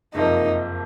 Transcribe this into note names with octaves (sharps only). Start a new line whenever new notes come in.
F#1 F2 C3 F3 A#3 D#4